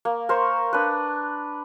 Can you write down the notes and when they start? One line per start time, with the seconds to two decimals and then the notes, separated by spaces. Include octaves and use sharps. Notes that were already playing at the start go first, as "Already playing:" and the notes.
0.05 A#3
0.29 A#4 C5 C#6
0.73 D4 B4